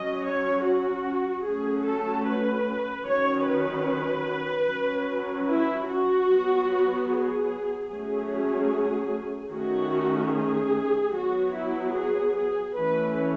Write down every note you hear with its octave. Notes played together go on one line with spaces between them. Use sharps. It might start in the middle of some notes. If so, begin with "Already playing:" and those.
Already playing: F#3 C#4 D#5
C#5
F#4
F#3 A3 C#4 G#4
A4
B4
D#3 F#3 C#4 C#5
B4
F#3 C#4
E4
F#4
F#3 B3
G#4
F#3 A3 C#4 G#4
D#3 A3 C#4 F#4
G#4
F#3 B3 F#4
E4
G#4
G#4
E3 A3 C#4 B4